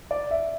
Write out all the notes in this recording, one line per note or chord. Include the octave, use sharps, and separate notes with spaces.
D5
E5